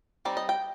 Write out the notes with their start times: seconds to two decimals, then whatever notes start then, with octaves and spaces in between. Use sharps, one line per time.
0.25 G3 C4 D#4 D5
0.37 D#5
0.49 G5